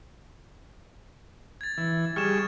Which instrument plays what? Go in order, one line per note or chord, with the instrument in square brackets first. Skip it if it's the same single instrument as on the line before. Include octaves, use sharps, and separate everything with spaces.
[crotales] G#6 A6
[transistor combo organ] E3
[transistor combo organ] G3 G#4 C#6 [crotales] F6 G#6 E7